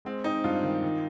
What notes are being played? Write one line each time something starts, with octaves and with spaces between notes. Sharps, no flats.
G#3 C4
C4 D#4
G2 F4
D#3
D#3